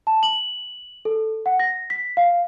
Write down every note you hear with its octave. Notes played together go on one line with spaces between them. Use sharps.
A5
F#7
A4
F#5
A#6
B6
F5